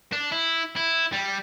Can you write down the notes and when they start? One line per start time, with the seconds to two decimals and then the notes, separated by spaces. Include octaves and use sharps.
0.13 D4
0.32 E4
0.77 E4
1.12 G3